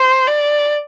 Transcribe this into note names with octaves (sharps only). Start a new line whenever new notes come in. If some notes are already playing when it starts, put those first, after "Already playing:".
Already playing: C5
D5